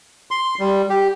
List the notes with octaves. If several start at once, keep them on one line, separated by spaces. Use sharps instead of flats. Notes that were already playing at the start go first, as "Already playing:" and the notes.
C6
G3
G4